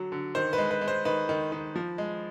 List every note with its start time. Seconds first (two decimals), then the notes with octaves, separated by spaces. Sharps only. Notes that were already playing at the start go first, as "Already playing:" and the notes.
Already playing: D3 F#3
0.12 D3
0.35 D#3 C5
0.53 B4
0.58 G#3
0.71 B4
0.81 G#3
0.88 C5
1.05 D#3 B4
1.29 D#3
1.52 D#3
1.75 F3
1.98 G#3